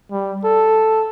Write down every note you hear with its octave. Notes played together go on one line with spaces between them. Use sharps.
G3
A4